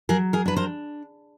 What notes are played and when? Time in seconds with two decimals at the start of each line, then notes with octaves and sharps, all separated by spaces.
0.09 F#3 G#4 A#4
0.33 G#4 A#4
0.46 D4 B4
0.56 A#4 C5